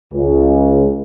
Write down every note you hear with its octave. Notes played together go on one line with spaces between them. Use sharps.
C#2